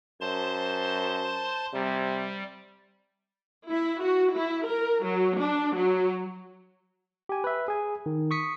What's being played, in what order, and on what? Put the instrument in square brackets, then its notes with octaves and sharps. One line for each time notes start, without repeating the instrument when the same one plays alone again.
[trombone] F#2 [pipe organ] C5 A5 C6
[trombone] C3 [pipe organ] G3
[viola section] E4
F#4
E4
A#4
F#3
D4
F#3
[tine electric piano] G4 G#5
B4 E5
G#4 G#5
D#3
C#6 D#6 B6 C#7